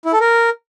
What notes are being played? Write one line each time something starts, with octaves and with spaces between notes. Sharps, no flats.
E4
A4
A#4